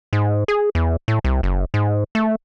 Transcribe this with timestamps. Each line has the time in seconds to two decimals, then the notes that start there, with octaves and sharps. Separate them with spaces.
0.13 G#2
0.48 G#4
0.75 E2
1.08 A2
1.24 C2
1.43 F#1
1.74 G#2
2.15 A3